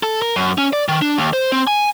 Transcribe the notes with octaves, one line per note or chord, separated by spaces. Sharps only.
A4
A#4
F#2
C#4
D5
D#3
D4
D#2
C5
C4
G#5